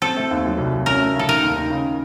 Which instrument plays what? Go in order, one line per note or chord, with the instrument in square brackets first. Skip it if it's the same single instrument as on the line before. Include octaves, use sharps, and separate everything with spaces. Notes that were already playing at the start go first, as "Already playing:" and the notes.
[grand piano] C4 [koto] A4
[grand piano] A3
D#2
F#3
C2
F#3
[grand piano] C#4 [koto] A#4
[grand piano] A3
[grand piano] C#3 [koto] A4
[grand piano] D#3 [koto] A#4
[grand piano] D#2
D#3
C#3